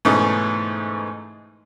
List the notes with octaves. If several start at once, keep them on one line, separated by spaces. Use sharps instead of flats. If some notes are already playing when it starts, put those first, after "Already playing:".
G#2 B2 E3 A3 C#4 D#4